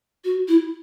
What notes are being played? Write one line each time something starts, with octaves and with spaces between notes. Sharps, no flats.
F#4
E4